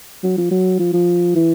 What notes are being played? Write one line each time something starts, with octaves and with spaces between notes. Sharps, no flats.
F#3
F3
F#3
F3
F3
E3